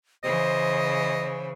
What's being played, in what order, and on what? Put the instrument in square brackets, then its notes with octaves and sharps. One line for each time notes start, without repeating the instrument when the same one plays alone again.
[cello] C#3 E3 [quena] C5 [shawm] D#5